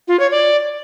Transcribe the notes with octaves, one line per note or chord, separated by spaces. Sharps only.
F4
C#5
D5